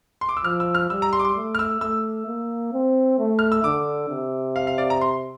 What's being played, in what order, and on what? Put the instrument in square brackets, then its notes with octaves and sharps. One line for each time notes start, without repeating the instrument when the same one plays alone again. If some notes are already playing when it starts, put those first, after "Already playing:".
[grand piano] C6
D6
E6
[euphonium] F3 [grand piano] F6
[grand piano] E6
F6
[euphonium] G3 [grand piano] E6
[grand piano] A#5
C6
D6
C6
[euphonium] A3
[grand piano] F6
E6
[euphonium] A3 [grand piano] E6
[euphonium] A#3
C4
A3
[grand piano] F6
E6
[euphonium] D3 [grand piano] D6
[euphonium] C3
[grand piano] F5
F5
D5
A#5
C6